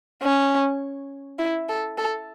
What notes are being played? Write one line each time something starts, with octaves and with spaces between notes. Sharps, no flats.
C#4
E4
A4
A4